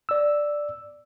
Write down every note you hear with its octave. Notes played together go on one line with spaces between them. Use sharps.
D5 E6